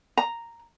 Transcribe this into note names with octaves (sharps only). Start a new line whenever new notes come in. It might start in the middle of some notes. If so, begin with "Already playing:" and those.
A#5